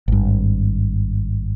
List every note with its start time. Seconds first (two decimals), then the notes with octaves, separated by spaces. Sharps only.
0.08 G#1 G2